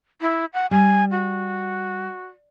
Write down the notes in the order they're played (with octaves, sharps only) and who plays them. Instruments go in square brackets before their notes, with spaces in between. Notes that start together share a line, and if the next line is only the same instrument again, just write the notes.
[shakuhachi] E4
F#5
[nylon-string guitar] G3 [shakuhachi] G#5
[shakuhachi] F#4